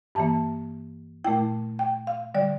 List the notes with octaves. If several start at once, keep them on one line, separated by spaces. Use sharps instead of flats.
G2 E3 A#3 A5
A#2 A3 E4 G5
G5
F5
D3 G3 D5